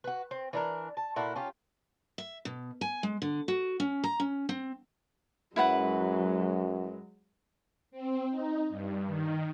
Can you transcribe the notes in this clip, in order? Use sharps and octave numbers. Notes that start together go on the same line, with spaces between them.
F#4 B4
C4
E3 D4 A#4
A5
A#2 E4 F#4 A4
C#4 F4 G4
E5
B2
G#5
G#3
D3
F#4
C#4
A#5
C#4
C4
F#2 F#3 G#3 E4 B4 F#5
C4
D#4
G2
D#3